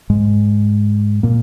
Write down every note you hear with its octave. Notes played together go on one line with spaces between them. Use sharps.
G#2 G#3
A#2 A#3